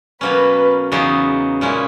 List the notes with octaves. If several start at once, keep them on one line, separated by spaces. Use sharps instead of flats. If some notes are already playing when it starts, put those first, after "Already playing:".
B2 F#3 A#3 C#4 B4
E2 C#3 F#3 B3 D#4
A#2 G#3 C#4 E4